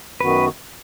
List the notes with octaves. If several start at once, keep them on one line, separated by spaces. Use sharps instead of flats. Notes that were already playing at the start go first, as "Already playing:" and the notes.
F#2 D#3 B3 F#4 B4